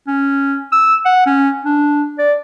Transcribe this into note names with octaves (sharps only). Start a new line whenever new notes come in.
C#4
E6
F#5
C#4
D4
D5